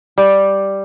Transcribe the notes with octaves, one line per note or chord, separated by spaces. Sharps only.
G3